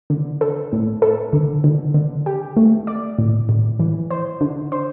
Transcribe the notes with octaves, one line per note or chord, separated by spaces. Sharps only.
D3
A4
A2
A4
D3
D3
D3
G4
A3
D5
A2
A2
E3
C5
D3
C5